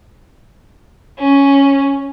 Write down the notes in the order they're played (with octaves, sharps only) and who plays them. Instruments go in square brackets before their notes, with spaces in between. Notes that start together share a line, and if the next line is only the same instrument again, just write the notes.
[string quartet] C#4